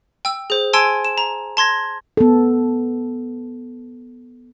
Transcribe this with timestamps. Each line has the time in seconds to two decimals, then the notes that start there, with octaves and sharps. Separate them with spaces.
0.25 G5 E6
0.50 G#4 C5
0.73 G#5 A5 C6 E6 G#6 D7
1.05 E7
1.18 A#5
1.57 A5 C6 G#6 A#6
2.17 B3 A4